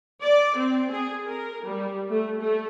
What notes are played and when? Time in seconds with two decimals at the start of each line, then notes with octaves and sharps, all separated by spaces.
0.22 D5
0.56 C4
0.90 G#4
1.27 A#4
1.65 G3
2.09 A3
2.39 A3